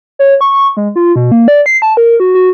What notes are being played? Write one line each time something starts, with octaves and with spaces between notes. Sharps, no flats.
C#5
C#6
G#3
F4
B2
A#3
D5
C7
A5
A#4
F#4
F#4